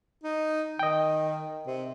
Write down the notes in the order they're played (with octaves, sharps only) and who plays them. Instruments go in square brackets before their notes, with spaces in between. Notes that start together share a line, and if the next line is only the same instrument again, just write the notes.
[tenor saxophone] D#4
[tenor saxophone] D#3 [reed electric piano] D#5 G5
[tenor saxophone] C3